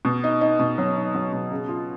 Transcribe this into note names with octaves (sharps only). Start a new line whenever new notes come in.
B2
D#4
D#4
B2
F#3
D#4
F#3
B2
C#3
F4